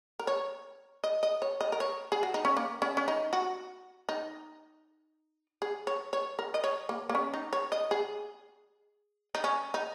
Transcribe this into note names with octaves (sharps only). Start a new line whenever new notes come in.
A#4
C#5
D#5
D#5
C#5
D#5
A#4
C#5
G#4
F#4
D#4
C#4
A#3
C#4
C#4
D#4
F#4
D#4
G#4
C#5
C#5
A#4
D#5
C#5
A#3
A#3
C#4
D#4
C#5
D#5
G#4
D#4
C#4
D#4